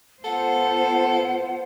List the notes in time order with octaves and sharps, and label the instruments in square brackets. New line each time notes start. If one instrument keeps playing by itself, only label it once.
[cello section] B3 F4 C5 [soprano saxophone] A4 [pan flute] F#5